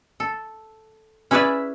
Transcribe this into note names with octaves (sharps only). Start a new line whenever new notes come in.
A4
C#4 E4 G#4 B4 D5 E5